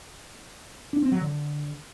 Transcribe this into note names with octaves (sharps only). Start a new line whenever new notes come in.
D4
C4
F#3
D3